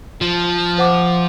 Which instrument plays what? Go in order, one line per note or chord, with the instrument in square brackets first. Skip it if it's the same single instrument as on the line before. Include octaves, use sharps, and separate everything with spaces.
[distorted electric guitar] F3
[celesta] C5 F#5 D6